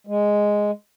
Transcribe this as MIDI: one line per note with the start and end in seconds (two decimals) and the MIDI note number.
0.07 0.71 56